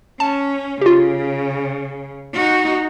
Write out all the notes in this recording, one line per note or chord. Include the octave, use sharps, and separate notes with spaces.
C#4 A5
C#3 F4 G4
D#4 F#4